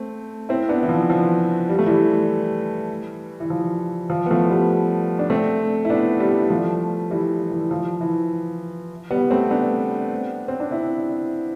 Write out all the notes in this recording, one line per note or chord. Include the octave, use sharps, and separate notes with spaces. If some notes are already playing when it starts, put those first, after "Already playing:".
Already playing: A3 C4
C4 E4
B3 D4
E3
F3
F3
G3
A3
E3 G3
E3
F3
F3
B3
F3 A3
G3 B3
D4
A3 C4
E4
B3 D4
G3 B3
F3 A3
E3 G3
E3
F3
E3
G3 B3
A3 C4
B3 D4
C4
D4
C4 E4